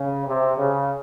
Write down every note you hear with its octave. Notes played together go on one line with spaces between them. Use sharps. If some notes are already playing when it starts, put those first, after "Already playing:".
Already playing: C#3
C3
C#3